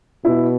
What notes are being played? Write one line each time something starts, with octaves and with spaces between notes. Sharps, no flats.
B2 E4